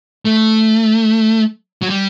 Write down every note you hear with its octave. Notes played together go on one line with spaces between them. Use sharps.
A3
F#3
G3